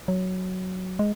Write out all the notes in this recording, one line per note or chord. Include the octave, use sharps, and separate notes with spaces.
F#3
G#3